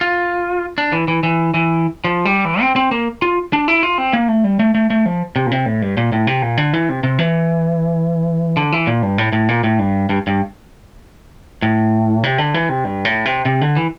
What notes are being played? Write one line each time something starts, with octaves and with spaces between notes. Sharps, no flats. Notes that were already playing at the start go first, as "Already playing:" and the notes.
F4
D4
E3
E3
E3
E3
F3
G3
E3
C4
C4
A#3
F4
D4
E4
F4
C4
A#3
A3
G3
A3
A3
A3
F3
C3
A#2
C3
A2
G2
A#2
A2
C3
A#2
D3
E3
C3
C3
E3
D3
E3
A#2
G2
A2
A2
A#2
A2
G2
G2
G2
A2
C3
D3
E3
C3
G2
A2
C3
C3
D3
E3